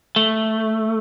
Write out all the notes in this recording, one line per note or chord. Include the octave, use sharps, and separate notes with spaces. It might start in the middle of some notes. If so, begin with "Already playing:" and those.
A3